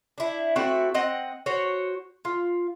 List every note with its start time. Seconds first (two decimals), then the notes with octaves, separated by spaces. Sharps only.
0.18 D4 E4
0.56 A3 C4 E4 F#4
0.94 C4 D#5 F#5
1.46 F#4 C5 C#5
2.25 F4